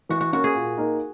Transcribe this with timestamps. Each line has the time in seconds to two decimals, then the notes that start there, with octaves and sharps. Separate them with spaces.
0.09 E3 F#4
0.21 F#4
0.33 A#3 C#4 F#4
0.44 G#4
0.55 A#2
0.77 A#3 D#4